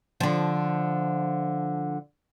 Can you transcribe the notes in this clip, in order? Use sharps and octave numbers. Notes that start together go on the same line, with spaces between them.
D3 F3